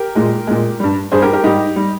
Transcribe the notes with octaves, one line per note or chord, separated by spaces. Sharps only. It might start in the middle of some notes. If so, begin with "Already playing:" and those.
Already playing: G4 A#4
A#2 G#3
A#2 G#3
G2 G3
G2 G3 G#4 C5
G4 A#4
G4 A#4
G#2 G3 D#4 G4
G3